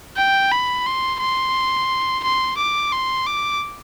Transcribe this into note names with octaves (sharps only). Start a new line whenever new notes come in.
G5
B5
C6
C6
C6
D6
C6
D6